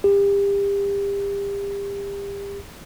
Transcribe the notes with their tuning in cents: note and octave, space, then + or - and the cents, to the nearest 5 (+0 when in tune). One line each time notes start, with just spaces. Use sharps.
G4 +30